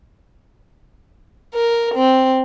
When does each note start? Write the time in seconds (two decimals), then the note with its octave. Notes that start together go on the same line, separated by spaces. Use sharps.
1.54 A#4
1.95 C4